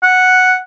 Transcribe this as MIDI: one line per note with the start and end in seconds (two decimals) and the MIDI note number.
0.03 0.57 78